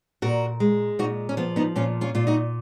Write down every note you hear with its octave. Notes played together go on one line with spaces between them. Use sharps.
A#2 F#4 A#4
G#3
A#2 D#4 F#4
C#4
F3 B3
B3 D#4
A#2 C#4 F4
C#4 F4
A#2 F4
D#4 F#4